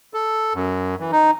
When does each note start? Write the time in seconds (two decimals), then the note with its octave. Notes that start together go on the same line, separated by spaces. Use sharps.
0.14 A4
0.54 F#2
1.00 E3
1.12 D#4